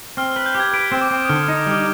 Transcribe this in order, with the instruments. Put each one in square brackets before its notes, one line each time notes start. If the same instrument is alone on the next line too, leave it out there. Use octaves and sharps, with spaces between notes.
[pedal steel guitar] C4 [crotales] F6
[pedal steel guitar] B4 [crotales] F6
[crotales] G6
[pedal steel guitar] G4
[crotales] G#6
[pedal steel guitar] B4 [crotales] D7
[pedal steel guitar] C4
[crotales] D6
[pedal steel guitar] C4 [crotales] D#6
[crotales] D#6
[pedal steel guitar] D3 [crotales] F6
[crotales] F6
[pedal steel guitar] D#4
[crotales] D#6
[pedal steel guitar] G3 [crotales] F6